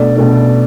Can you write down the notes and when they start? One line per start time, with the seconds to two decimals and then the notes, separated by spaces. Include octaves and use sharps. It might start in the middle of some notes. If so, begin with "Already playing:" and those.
Already playing: B2 A3 D4 D5
0.16 B2 A3 D4